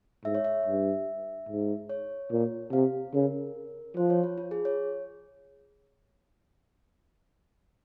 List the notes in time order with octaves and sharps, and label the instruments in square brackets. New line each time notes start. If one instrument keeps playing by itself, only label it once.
[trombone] G#2 [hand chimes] E5
[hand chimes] C#5
E5
[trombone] G2
G#2
[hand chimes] C#5
[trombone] A#2
[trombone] C3 [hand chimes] F5
[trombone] C#3 [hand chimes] A#4
[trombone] F3 [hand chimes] C5
[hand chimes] C#5
F4
F4
G#4
C#5